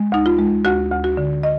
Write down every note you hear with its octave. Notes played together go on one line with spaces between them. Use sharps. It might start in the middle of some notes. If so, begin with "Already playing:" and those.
Already playing: G#3
D2 D#4
F4
G#3
D2 F#4
D2
F#4
D3
D#5